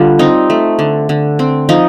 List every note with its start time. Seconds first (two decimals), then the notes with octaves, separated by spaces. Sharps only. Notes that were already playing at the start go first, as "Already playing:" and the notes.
Already playing: D3 G3 F4
0.19 C4 D#4
0.50 A3
0.79 D3
1.09 D3
1.39 C4
1.69 F3 D#4